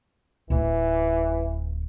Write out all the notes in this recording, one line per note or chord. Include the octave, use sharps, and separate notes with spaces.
D1 E3 D#4